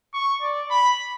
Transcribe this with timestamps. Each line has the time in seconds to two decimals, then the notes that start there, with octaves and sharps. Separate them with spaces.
0.14 C#6
0.42 D5
0.70 B5